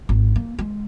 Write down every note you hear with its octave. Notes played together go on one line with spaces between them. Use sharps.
G#1
A#3
G#3